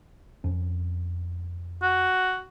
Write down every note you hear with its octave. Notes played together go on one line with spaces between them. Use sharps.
F2 C#4
F#4